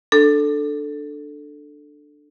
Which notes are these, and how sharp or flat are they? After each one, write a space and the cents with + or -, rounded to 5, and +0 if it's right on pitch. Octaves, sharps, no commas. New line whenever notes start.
D4 +10 A4 +0